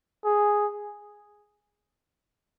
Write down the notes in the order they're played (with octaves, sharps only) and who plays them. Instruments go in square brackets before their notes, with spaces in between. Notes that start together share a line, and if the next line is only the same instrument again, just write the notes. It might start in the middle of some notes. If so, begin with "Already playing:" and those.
[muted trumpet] G#4